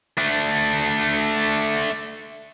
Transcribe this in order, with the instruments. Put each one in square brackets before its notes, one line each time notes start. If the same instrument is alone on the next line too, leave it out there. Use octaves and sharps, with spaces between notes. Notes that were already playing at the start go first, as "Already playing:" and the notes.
[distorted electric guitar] A3 D4